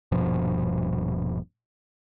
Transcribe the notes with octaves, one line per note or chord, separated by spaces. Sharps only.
D#1 G2 B2 F3